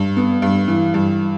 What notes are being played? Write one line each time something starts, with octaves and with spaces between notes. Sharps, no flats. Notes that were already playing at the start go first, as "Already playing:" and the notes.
Already playing: G2
B3
G2
E3
G2